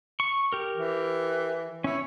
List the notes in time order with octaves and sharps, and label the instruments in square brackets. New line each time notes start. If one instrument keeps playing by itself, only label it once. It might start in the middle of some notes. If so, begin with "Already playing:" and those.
[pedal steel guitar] C#6
G4 A#4
[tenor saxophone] E3
[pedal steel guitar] C#4 C#5 [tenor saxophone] E4